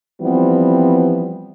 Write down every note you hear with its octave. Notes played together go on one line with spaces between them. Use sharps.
E3 F3 G3 B3 C4